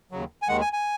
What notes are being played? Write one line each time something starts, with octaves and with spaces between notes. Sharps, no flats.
D#2 C#3 F#3
G#5
D#2 D#3 G#3 F#5
G#5
G#5